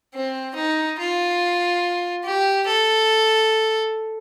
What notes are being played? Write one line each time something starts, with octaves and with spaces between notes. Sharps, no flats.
C4
D#4
F4
G4
A4